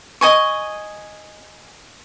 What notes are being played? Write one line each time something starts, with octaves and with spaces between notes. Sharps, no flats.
D#5 G#5 C#6